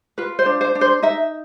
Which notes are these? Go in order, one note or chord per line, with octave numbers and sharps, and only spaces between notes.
F4 B4
C5
D4
C5
D4
C5
D#4 E5